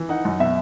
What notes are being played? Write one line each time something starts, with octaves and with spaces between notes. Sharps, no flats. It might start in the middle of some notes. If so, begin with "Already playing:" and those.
Already playing: E3
D#4 F#5
F#2
B2 E5